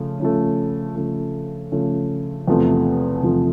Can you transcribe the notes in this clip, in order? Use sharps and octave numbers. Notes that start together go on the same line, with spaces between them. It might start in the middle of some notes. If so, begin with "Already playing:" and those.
Already playing: C#3 F3 A3
C#3 F3 A3
C#3 F3 A3
C#3 F3 A3
E2 C3 F3 A3
E2 C3 F3 A3